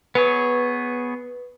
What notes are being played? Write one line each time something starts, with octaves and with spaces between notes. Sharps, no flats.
B3 G#4 B4 C#5